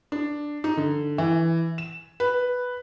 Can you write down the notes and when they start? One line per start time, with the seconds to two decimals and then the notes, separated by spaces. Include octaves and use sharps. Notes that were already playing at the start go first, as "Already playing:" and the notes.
0.12 D4
0.64 D#4
0.77 D3
1.18 E3
1.78 E7
2.20 B4